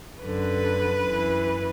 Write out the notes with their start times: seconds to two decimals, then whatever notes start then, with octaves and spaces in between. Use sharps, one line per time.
0.24 F#2 D3 B4
1.04 F#2 E3